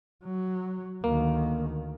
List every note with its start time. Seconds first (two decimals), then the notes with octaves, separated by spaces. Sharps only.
0.24 F#3
1.04 D2 D#3 A#3